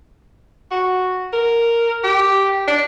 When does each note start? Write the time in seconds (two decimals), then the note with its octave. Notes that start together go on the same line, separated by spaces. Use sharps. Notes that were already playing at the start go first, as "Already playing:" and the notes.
0.71 F#4
1.32 A#4
2.03 G4
2.67 D4